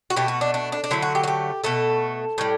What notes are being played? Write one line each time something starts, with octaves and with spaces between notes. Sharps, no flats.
F#4
B2 A3 G4
F#4
D4
D4
D4
D4
D3 F#3 A3 E4
F#4
G4
F#4
G4
B2 A3 A4
A2 G3